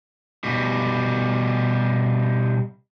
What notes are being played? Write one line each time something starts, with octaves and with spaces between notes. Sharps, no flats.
B2 G3